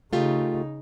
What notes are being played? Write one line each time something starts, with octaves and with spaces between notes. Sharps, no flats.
C#3 A3 D#4 F4 G4